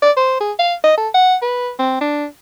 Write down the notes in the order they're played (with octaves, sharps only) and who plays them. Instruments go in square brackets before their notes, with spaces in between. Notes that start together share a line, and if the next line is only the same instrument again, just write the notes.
[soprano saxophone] D5
C5
G#4
F5
D#5
A4
F#5
B4
C4
D4